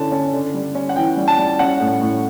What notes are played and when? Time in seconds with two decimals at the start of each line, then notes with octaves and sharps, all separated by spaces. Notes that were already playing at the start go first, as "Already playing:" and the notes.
Already playing: D3 C#4 E4 A5
0.11 C#4
0.33 D3
0.54 G3
0.75 C#4
0.89 F#5
0.96 E3 G5
1.17 G3
1.28 A5
1.38 G3
1.59 C#4 F#5
1.80 A2
2.01 A2